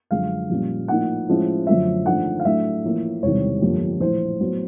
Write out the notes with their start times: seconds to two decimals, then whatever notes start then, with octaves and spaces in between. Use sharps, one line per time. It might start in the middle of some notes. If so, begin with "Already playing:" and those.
0.11 F#2 D3 F3 G#3 F5
0.50 A#1 A#2 G3 A#3 C#4
0.88 A2 F3 A#3 D#4 F#5
1.28 A2 F3 G#3 C#4 E4
1.67 F#2 D3 F3 A3 D4 E5
2.05 G#1 G#2 F3 A3 D4 F#5
2.40 F5
2.44 A2 F#3 A3 D4 E5
2.84 A1 A2 F3 A#3
3.22 E1 E2 C3 D#3 G3 C#5
3.62 G1 F2 D3 G3 A#3
4.00 A#1 A2 E3 C5
4.40 A2 F#3 B3